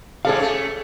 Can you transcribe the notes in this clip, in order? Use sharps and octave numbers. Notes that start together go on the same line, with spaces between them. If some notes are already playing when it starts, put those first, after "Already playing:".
G#2 C3 G3 G#4 A4 F5
A3 C#4